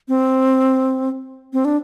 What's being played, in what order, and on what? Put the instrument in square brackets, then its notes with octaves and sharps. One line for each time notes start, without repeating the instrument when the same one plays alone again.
[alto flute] C4
C4
D4